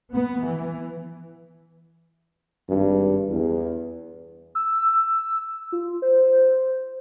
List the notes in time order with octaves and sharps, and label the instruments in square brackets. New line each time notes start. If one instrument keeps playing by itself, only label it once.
[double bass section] B3
E3
[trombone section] G#1 G2
E2
[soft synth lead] E6
F4
C5